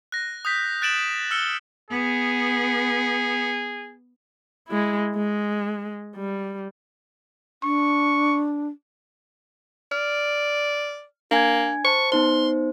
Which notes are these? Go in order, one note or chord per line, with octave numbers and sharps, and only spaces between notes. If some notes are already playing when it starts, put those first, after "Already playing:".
F#6 A#6
D#6 G6 B6
F#6 A6 D7 E7 F#7
E6 F6 C#7 G7
B3 G#4
G#3 E4
G#3
G3
D4 C#6
D5 F6
A#3 D4 G#5 G#6
C5 A5 C#6
B3 D#4 C5 C6